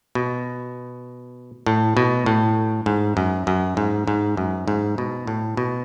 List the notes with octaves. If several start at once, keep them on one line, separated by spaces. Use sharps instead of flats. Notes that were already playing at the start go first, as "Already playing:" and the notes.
B2
A2
B2
A2
G#2
F#2
F#2
G#2
G#2
F#2
G#2
B2
A2
B2